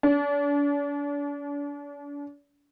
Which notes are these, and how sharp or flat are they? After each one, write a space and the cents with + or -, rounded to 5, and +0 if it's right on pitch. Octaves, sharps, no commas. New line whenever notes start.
D4 -40